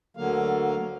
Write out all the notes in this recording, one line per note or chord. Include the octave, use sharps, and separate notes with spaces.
D2 D3 F#3 A#3 F5